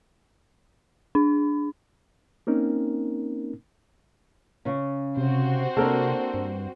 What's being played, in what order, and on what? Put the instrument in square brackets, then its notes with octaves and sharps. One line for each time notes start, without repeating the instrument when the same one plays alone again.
[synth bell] D4
[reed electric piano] A#3 C4 C#4 D#4 A#4
[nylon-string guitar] C#3 C#4
[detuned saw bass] C3 [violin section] C4 F#4 C5
[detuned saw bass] C3 [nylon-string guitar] A#3 D4 [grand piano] A4 A#4
[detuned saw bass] G2